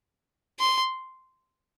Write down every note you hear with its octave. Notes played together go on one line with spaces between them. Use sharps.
C6